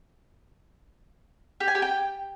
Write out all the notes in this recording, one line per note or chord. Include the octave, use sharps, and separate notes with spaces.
G4
G#5
G4
G5